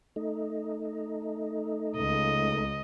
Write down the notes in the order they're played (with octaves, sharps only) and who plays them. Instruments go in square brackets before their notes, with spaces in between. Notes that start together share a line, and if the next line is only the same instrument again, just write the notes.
[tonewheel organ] A3 D#4
[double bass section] C#2 [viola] D#5